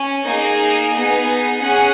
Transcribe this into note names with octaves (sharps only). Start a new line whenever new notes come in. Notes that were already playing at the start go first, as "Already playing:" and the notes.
Already playing: C#4
A#3 D#4 G#4 G#5
B3 D#4 G#4
C#4 G#4 F#5